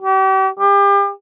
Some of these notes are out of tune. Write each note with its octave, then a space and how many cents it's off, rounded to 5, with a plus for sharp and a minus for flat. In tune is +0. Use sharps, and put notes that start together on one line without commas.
G4 -40
G4 +35